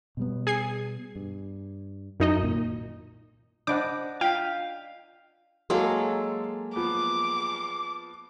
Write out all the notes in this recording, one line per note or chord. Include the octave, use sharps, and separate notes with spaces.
B2 G3 B3
G#4 G#5 C7
G2
F#2 D#4 D#5
C2 A#2 D#3
D4 C5 D#5 F#5 B5 D6 G6
F4 F5 G5 G6 B6
F#3 G#3 A#3 A4 F5 C6
F3 B3 D6